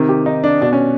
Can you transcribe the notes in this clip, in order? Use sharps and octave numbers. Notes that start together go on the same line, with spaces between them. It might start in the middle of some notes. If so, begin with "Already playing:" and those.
Already playing: C3 D#3
G4
D#4
D4
B2 D4
C#4